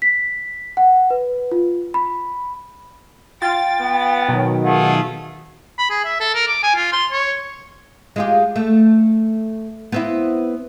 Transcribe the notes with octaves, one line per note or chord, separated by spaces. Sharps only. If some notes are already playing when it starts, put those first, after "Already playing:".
B6
F#5
B4
F4
B5
F4 G5 A6
B3
B2 D#3 F#3
A3 F4 G#4 F#5
B5
G#4
E5
A4
A#4
D6
G#5
F4
C6
C#5
G#3 F4 G4
A3
B3 C4 E4